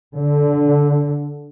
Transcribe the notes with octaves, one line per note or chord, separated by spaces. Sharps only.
D3